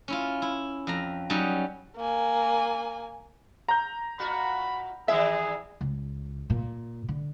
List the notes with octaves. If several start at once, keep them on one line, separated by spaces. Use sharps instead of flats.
C#4 E4 F4
E4
F2 A#5
F#3 G3 C#4 D#4
A#3 G#5
A#5 G6
A2 F4 F#4 B5
D#3 G3 E4 G#4 E5
C#2
A#2
D3